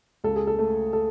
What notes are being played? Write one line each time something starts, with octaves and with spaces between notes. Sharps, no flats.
C#2 A4
G#4
A4
A3
A4